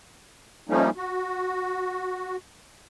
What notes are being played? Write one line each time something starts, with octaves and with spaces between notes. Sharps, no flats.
F3 G3 A3 A#3 C#4 D#4
F#4